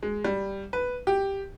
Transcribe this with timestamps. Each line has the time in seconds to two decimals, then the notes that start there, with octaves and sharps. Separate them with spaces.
0.03 G#3
0.25 G3
0.73 B4
1.07 G4